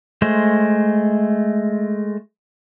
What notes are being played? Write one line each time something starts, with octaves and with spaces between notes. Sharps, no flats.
G#3 A3 C5